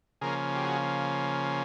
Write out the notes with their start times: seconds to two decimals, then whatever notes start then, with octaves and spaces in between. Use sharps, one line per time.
0.21 C#3 F3 A#3 C#4 G#4 A#4
0.56 G4
0.64 F#4 G#4